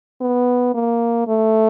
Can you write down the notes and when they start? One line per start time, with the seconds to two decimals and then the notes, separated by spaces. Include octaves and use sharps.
0.21 B3
0.74 A#3
1.28 A3